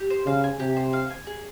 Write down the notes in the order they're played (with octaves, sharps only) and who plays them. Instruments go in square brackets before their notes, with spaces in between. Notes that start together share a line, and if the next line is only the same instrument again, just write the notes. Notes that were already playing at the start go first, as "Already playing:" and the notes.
Already playing: [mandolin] G4
C5
[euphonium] C#3 [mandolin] F5
[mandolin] G#5
[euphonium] C3 [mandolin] G4
[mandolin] C5
F5
G#5
G#4